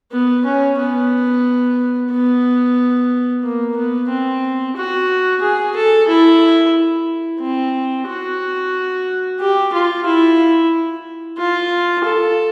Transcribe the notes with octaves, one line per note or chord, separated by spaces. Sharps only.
B3
C#4
B3
B3
A#3
B3
C4
F#4
G#4
A4
E4
C4
F#4
G4
F4
E4
F4
A4